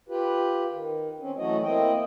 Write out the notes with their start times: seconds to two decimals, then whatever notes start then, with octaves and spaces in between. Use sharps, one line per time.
0.09 F4 G4 B4
0.73 D#3
1.20 C4 C#4
1.37 E3 F#3 A3 E4 F#4 D#5
1.63 A#3 C4 E4 D#5 G5